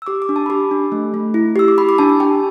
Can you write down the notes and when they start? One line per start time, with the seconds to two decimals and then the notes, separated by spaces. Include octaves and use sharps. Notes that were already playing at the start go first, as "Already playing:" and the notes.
0.02 E6
0.07 G4 D6
0.22 D6
0.29 D4
0.36 A5
0.46 B5
0.50 G4 D6
0.71 D4
0.92 A3
1.14 A3
1.34 E4
1.56 G4 E6
1.68 D6
1.78 G4 B5
1.89 D6
1.98 D4 A5
2.09 A5
2.20 G4 G5